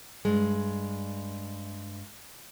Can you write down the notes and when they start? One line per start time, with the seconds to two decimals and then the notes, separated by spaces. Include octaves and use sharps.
0.25 G2 G#3